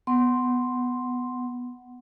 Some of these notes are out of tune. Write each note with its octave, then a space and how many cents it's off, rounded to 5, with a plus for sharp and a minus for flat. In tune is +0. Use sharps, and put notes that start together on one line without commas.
B3 +5 F#5 +5 C6 +0